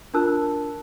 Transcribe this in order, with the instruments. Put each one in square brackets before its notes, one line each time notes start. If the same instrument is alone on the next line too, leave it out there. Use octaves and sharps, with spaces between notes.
[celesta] D4 F4 A#4 A5 E6 F#6